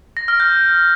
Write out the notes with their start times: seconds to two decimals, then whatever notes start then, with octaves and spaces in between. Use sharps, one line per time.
0.17 A#6
0.28 F6
0.40 G6